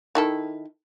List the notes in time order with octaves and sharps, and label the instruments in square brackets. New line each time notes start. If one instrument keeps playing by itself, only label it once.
[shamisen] D#3 E4 A4